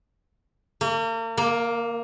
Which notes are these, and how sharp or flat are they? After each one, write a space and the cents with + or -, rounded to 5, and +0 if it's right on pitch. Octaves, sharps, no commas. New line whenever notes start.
A#3 -40
A#3 +5